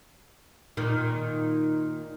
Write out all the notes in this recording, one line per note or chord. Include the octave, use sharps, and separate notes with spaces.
A#2 D#3